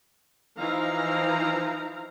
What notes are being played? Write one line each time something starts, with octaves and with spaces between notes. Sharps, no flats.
E3 F3 D#4 E4 F5 A#5